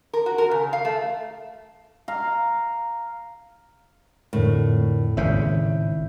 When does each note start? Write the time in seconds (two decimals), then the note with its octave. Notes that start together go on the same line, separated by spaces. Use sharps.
0.13 A#4
0.26 F#4
0.38 A#4
0.51 C#3
0.73 F5
0.85 A3
2.08 F5 A#5
4.33 F2 A2 D3 A#4
5.17 G#1 C#3 E5 G6